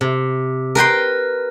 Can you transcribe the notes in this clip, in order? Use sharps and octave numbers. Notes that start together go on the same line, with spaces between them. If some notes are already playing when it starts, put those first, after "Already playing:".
C3
A#4 B4 G5 C6